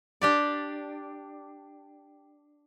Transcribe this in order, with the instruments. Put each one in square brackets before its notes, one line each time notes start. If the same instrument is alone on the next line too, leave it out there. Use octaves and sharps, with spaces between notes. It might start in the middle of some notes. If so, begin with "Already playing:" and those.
[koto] D4 G4 D5